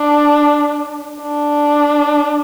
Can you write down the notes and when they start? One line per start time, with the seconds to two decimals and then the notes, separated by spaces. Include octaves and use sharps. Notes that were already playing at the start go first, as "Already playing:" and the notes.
Already playing: D4
1.22 D4